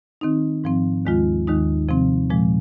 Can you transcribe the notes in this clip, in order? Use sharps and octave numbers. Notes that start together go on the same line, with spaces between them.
D#3 C4 D#4
G#2 F3 C4
D#2 D#3 G#3 F4
D#2 D#3 G#3 D#4
C3 F3 C4
A#2 F3 G#3